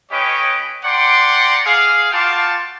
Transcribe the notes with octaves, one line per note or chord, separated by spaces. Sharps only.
C#4 G4 B4 C#5 D#5 G5
D5 F#5 G5 A#5 C6 D6
G#4 F5
F4 F#4 F5 G5 A5 D6